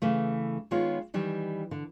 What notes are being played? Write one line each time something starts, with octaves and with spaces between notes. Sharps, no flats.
C#3 E3 A3
D#3 G#3 B3 F4 C#5
D#3 E3 G3
D3